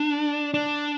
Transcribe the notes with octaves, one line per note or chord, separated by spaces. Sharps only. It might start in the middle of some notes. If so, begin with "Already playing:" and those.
Already playing: D4
D4